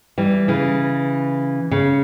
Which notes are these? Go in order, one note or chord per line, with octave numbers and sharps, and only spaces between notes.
E3 G3
C#3 E3
C#3